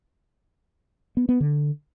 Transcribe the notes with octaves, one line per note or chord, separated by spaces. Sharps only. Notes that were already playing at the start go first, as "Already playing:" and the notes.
B3
B3
D3